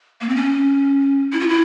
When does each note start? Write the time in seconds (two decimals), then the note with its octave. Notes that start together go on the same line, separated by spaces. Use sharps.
0.21 A#3
0.29 C4
0.36 C#4
1.33 E4
1.40 F4
1.49 E4